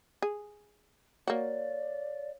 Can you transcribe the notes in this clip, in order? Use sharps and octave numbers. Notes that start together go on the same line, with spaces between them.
G#4
A#3 F#4 C#5 D5 F5